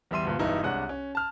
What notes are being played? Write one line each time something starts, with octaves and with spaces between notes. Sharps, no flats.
E2 G3 E5 C6 D#7
D2 G2 A#2
E1 G2 D#4 E4
C2 G#3 D4 C#5 F#5 F#6
C#4
A5 F6